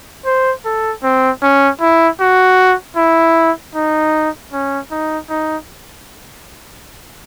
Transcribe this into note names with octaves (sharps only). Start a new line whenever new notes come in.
C5
A4
C4
C#4
E4
F#4
E4
D#4
C#4
D#4
D#4